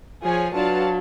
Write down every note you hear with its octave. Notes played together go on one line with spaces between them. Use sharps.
F3 G#4 C#5 G#5
F#3 D4 F4 B4 F5 A5